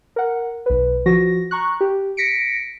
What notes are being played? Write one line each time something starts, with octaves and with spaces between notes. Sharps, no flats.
A#4 F#5
B1 B4
F3 F#4 A#6
A#5 C#6 F#6
G4
A#6 B6 C#7 D7